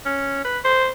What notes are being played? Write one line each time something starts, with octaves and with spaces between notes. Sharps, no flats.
C#4
B4
C5